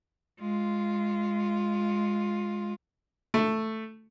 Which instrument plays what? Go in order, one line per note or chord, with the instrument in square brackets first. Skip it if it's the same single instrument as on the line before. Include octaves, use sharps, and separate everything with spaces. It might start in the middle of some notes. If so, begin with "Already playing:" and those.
[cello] G#3 F4
[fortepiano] A3